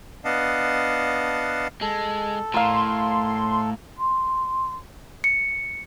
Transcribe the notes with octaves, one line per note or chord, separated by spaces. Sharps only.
B3 D4 D#5 F5 F#5 A5
G#3 A4
A2 A#4 F5 C6
C6
C#7